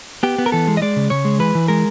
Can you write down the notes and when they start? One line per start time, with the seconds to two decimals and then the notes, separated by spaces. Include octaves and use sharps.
0.23 B3 G4
0.38 B3
0.46 A#4
0.52 E3 A4
0.68 G#3
0.77 D#5
0.82 G#3 D5
0.96 C#3
1.10 C#3 C#5
1.25 G#3
1.39 E3 B4
1.55 E3
1.68 G#3 A#4